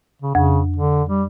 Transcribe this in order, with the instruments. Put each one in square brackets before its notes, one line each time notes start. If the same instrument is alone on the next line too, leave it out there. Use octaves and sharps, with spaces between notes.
[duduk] C#3
[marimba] F2 [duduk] C#3
[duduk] D3
G3